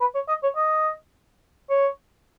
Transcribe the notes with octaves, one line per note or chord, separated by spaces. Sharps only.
B4
C#5
D#5
C#5
D#5
C#5